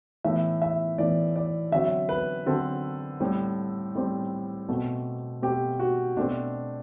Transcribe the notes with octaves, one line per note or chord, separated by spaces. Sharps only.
A2 E3 B3 E5
E5
A2 E3 B3 D5
D5
D3 F#3 C4 E5
B4
D3 F#3 C4 A4
A2 G3 C4
A2 G3 C4
B2 A3 C4
B2 A3 C4 G4
F#4
B2 A3 C4 D4